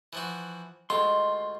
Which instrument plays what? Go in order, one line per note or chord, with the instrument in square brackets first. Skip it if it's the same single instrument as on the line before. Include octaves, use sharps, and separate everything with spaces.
[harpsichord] E3 F3 F#4
[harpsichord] D2 F4 [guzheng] G#3 [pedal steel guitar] C6